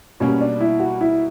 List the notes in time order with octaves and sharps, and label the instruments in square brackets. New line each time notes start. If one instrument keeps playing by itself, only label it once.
[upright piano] B2 G3 A#3 [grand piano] C#4
[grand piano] D4
E4
F#4
E4